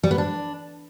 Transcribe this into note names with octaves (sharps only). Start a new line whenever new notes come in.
G3
B3
D4